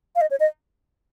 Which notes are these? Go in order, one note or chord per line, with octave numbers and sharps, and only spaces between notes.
F5
D#5
C#5
D#5